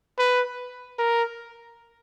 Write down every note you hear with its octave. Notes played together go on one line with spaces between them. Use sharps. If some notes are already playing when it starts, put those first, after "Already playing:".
B4
A#4